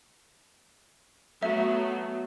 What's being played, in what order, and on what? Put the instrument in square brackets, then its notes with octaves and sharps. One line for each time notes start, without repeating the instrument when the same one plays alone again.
[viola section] F#3 A3 B3 [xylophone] E5